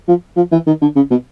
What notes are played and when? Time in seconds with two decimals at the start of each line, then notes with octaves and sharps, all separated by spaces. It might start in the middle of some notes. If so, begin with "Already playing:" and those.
0.08 F3
0.37 F3
0.52 E3
0.67 D#3
0.82 D3
0.96 C#3
1.11 B2